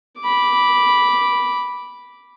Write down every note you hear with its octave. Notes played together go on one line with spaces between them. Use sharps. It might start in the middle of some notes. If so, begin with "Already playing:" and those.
B5 D6